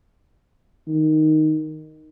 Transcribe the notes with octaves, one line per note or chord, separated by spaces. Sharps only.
D#3